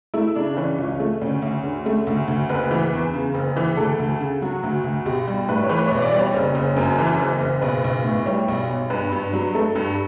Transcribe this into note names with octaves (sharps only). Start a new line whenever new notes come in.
A3 E4
C#3 D4
E3 C#4
C#2
A3
D2 C#4
D2
D3
A3
D2
D2
F#1 B4
E3
E2
C#3
F#1
E3
D2 A4
D2
C#3
F#3 F#4
D2
D2
B1 G4
G3
A2 B4
C#5
E3 B4
B1 C#5
D5
G3
C#5
F#1
F#1
F#2
E3
F#1
F#1
B1 B4
B1
A2
G3 C#5
B1
B1
G2 B4
G2
F#3
A3 A4
G2